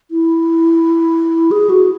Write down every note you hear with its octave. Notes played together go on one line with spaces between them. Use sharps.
E4
G#4
F#4